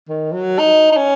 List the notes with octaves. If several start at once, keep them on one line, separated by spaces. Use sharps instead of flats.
D#3
F#3
D#4
D#4
C#4